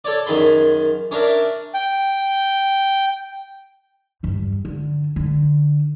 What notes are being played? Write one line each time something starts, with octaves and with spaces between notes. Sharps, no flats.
A4 C#5 D5
F#2 D#3 G#4 B5 C6
C#4 D4 A#4 D5 E5
G5
E2 G2
D3
D3